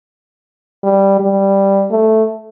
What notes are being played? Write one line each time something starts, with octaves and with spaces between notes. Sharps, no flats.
G3
G3
A3